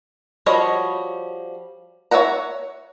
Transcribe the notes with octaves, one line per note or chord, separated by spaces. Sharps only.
F3 G3 F#4 C#5 D#5
C#5 D#5 E5 F#5 A#5